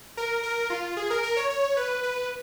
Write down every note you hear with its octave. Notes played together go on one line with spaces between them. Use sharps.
A#4
A#4
F4
G#4
A#4
A#4
C#5
C#5
B4
B4